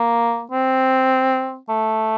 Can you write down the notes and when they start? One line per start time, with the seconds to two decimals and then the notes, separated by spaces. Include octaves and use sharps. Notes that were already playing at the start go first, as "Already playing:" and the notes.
Already playing: A#3
0.52 C4
1.69 A3